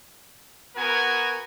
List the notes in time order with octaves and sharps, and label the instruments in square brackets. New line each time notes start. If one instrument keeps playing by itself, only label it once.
[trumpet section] B3 F#4 A#4 G#5